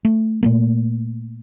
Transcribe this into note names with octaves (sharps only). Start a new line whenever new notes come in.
A3
A#2 A3 A#3